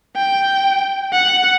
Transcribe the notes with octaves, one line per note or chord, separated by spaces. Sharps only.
G5
F#5